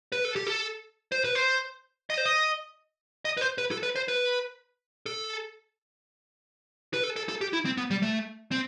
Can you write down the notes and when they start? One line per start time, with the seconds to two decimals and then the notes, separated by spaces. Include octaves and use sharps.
0.12 B4
0.25 A4
0.36 G4
0.47 A4
1.12 C5
1.24 B4
1.35 C5
2.10 D#5
2.17 C5
2.26 D#5
3.25 D#5
3.37 B4
3.41 C5
3.58 B4
3.71 A4
3.83 B4
3.96 C5
4.08 B4
5.06 A4
6.93 B4
7.04 A4
7.16 A4
7.29 A4
7.41 G4
7.53 E4
7.65 C4
7.77 B3
7.91 G3
8.03 A3
8.51 C4